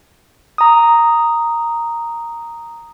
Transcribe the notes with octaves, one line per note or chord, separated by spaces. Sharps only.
A#5 D#6